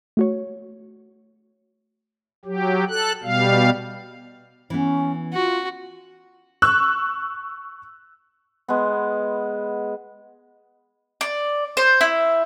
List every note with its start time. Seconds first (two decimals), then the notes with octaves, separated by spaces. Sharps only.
0.17 A3 F#4 C#5
2.45 F#3 G4
2.89 A4 F#6
3.23 B2 G3 F5
4.70 E3 B3 C#4
5.34 F4 F#4
6.62 C#6 E6 F#6
8.68 G#3 B3
11.21 D5
11.77 C5
12.01 E4